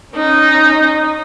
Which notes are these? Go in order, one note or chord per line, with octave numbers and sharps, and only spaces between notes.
C#4 D#4